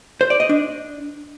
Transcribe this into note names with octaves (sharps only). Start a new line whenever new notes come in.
C5
D5
D#5
D4